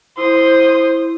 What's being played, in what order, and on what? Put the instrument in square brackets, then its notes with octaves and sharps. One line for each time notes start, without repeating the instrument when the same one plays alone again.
[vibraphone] E4 [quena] C5 [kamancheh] C6 D#6